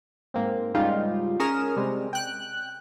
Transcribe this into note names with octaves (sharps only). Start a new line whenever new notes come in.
G#2 A#3 C4
G#2 C#3 G3 D#4 F4 G4
C#4 G#4 A#4 D#6 F6 E7
C3 G3 G#3
G5 F#6